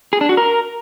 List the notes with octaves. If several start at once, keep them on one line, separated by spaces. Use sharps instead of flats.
G#4
D4
F#4
A#4